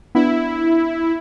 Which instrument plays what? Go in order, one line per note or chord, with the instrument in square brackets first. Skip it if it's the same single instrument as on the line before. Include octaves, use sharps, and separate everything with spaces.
[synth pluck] B3 D4 [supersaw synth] E4